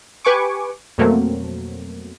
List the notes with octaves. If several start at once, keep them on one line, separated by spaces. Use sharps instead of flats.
G4 B4 G#5 C#6 D6
F2 B2 F#3 A3 A#3 C4